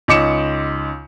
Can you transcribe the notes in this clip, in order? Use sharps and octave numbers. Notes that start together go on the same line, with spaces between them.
C#2 D#4 D6 C#7 E7